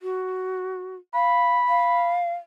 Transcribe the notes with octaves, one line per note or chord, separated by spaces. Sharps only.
F#4
F5 B5
F5